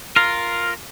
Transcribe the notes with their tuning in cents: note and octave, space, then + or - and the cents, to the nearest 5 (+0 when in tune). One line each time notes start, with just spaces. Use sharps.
F4 +0 A#4 +0